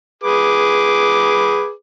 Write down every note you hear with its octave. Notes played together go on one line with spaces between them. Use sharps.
G#4 B4 D6